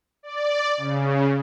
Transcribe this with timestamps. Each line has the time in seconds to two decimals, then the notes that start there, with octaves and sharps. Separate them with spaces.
0.23 D5
0.77 C#3